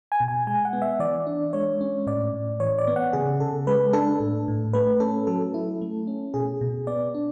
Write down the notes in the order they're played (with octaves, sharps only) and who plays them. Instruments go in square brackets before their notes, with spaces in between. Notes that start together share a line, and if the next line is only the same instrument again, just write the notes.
[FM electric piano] G#5
B2
G#5
G#3 G#5
F#5
B3
E5
E3 D5
D4
G#3 C#5
C#4
A2 D5
A2
E3 C#5
D5
B3
F#5
C#3 G#4
C#3 A4
G#3 B4
D4 A4
A2
A2
A3 B4
C#4 A4
F#3 A4
E4
A3
C#4
B2 G#4
B2
B3 D5
D4